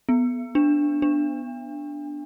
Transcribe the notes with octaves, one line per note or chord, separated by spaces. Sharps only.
B3
D4
D4